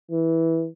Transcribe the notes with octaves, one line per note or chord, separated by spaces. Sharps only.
E3